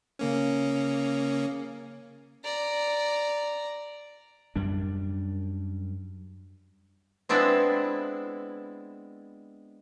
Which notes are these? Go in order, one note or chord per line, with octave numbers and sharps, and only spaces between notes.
C#3 A#3 C#4
D5 A#5
F#2 G3 D4
G#3 B3 C4 D4 E4